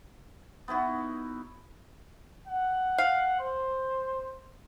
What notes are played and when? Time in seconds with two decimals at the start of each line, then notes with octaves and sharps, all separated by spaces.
0.68 B3 D#4 E4 F#4
2.48 F#5
2.98 F5
3.40 C5